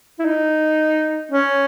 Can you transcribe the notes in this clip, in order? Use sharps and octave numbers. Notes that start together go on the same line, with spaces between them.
E4
D#4
C#4